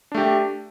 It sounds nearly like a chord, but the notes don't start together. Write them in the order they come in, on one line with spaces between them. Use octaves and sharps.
D4 A3 G4